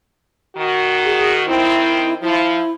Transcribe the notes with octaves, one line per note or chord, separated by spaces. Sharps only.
D#3 F#4
G#4
D#3 C4 E4
F3 E4